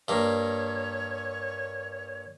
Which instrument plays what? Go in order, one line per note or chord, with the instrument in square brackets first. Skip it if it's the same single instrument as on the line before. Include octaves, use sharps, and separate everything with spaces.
[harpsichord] G2 A#3 [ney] C#5